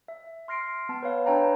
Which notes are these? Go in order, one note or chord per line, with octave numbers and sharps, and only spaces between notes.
E5
C6 F6 A#6 C7 D7
B3 A5
B4 C#5 F5
D4 B4 C#5 G5 A5 A#5